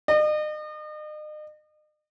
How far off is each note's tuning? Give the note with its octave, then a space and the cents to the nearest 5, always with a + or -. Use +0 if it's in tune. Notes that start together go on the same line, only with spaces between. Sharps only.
D#5 -40